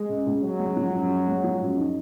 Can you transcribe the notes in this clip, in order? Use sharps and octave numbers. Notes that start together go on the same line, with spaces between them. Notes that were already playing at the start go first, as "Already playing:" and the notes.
Already playing: G#3
C#3
C#2
F#3 C#4
G#3
F3
F#2
C#4
G#3
F3
F#2
D#4